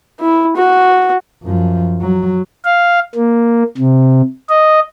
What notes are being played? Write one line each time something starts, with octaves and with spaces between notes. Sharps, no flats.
E4
F#4
F#2 F3
F#3
F5
A#3
C3
D#5